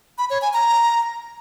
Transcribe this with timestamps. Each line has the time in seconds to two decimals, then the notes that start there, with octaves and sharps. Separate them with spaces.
0.18 B5
0.30 C#5
0.42 G#5
0.53 A#5